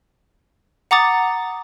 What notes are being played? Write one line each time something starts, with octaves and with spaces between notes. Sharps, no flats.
F#5 A#5 D6 D#6 A6